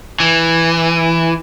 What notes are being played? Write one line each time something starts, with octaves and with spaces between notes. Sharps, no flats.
E3